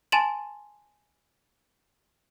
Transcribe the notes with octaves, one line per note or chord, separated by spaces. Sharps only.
G#5 A5 C6 A6 E7 F#7